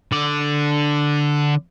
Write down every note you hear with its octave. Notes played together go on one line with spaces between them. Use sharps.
D3 D5